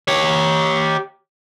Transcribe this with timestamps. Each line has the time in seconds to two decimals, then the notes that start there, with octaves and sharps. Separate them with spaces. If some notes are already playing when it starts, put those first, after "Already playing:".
0.08 G4 C#5